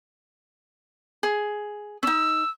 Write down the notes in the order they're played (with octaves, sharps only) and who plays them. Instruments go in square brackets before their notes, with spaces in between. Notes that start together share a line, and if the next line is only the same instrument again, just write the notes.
[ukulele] G#4
[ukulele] C#4 D#4 [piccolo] E6